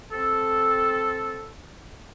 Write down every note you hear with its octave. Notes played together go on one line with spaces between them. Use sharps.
C4 A4